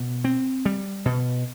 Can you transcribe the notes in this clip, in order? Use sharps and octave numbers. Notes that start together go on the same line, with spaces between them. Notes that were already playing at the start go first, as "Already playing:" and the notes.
Already playing: B2
C4
G3
B2